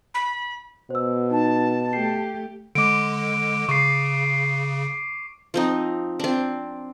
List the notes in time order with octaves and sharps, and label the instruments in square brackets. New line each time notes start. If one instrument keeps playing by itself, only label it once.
[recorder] B5
[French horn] B2 [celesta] C5 E6
[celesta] D#4 [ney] A5
[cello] A3 G4 [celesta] C7
[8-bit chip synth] D3 G#3 [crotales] D6 D7
[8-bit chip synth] C#3 [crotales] C#6 C7
[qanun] F3 C4 D#4
C4 D4